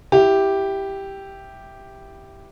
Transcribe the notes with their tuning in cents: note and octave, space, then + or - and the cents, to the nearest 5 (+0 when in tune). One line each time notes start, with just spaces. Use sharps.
E4 +5 G4 +0